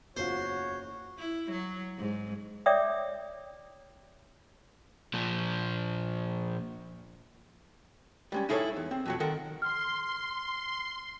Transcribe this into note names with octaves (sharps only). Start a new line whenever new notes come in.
F#1 E2 F4 F#4 C5 C#5
E4
F#3
G#2
C#5 D5 E5 G5 D6 D#6
A#2 F3
G3 G#3 C#4
D#4 E4 G#4 A4 B4 C#5
E2
C4
F2 B2 F#3
D#3 A4 A#4 F#5
C6 F6